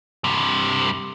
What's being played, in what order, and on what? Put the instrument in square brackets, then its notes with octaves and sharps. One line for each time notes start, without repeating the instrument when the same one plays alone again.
[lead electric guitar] G2 C3